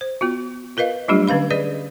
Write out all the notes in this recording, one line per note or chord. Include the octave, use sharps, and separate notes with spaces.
C5
B3 F4 F#4
F4 A#4 B4 D#5 F5
F#3 G3 A3 D4 F4 G4
D3 C#4 B4 F5 B5
G#4 B4 D5 D#5